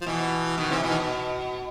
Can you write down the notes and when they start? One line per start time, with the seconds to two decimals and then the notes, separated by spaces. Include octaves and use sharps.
0.01 F3
0.06 B2 E3
0.57 B2 D#3
0.70 C3 E3
0.83 B2 E3
0.91 D#3